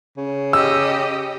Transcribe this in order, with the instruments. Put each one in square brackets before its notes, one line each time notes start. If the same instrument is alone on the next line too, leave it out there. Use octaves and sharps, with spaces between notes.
[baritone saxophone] C#3
[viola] G4 D#5 [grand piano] E6